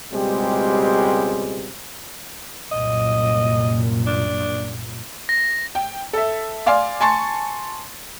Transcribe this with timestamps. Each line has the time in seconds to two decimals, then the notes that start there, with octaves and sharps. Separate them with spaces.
0.13 C#2 B2 G3 G#3 C4 G4
2.72 C2 F#2 A#2 D#5
4.06 D4
5.29 A#6
5.75 G5
6.13 A4 E5
6.66 D5 F5 G#5 C6
7.01 G#5 A5 C6 C#6 A6